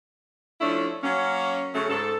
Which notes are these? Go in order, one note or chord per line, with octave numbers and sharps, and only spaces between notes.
F3 A3 C#4 D4 E4
F#3 A#3 C#4
C#3 F#3 A3 C#4
G#2 A4